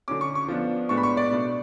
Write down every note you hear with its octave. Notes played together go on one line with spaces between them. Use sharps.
D3 F#3 C#4 D6
C#6
C#6
F3 B3 D4
A2 G#3 B3 D4 C#6
B5
C#6
D5
B2 A3 D4